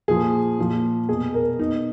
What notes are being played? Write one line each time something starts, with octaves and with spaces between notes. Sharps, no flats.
A#2 F3 G#4
A#2 F3
B2 G#4
A#4
B2 D#4